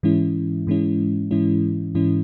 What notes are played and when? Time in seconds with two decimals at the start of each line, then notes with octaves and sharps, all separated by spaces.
0.03 G#2 E3 G#3 C#4 E4
0.67 G#2 E3 G#3 C#4 E4
1.31 G#2 E3 G#3 C#4 E4
1.95 G#2 E3 G#3 C#4 E4